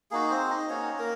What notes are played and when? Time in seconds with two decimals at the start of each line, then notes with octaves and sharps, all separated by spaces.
0.11 A#3 D#4 F#4 G#4
0.30 C4 C5
0.50 D#4 D#5
0.69 A#3 C#4 D#4 F#4 C#5
0.99 A#3 A#4